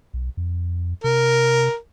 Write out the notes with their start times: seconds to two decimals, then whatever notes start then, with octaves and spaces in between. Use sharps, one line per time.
0.14 B1
0.37 F2
1.04 C3 A#4